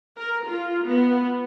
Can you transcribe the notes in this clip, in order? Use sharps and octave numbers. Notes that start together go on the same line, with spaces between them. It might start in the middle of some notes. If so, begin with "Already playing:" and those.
A#4
F4
B3